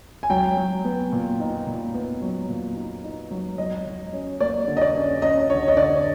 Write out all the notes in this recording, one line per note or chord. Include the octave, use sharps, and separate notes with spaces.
G#5
F#3 G5
F#3
B3
A#2
D#4
A#2
B3
F#3
A#2
D#4
D#4
F#3
F#3 D#5
F#3
C#4
A#3 D5
D3
D#5
D5
C#4
C#4 D#5
D3 C#5
D#5
D3 D5